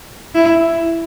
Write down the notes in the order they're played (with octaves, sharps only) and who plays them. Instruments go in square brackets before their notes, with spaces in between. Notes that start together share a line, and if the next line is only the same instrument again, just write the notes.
[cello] E4